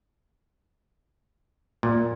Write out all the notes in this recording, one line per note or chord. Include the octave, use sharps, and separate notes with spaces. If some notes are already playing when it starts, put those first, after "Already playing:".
A#2